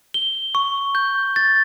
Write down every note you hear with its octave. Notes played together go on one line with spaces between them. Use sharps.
G7
C#6
G6
A6